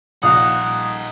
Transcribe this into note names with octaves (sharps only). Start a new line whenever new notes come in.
A#1 D#4 F5 F#5 D#6